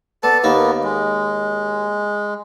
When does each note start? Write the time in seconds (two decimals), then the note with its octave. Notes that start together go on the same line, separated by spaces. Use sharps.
0.23 B3 A4 D5 A5
0.44 D#2 A#3 B3 D#4
0.84 G#3